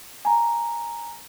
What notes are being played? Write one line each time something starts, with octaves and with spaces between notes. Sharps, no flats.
G#5 A#5